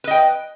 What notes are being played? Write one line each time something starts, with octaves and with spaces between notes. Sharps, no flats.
B4 D#5 G5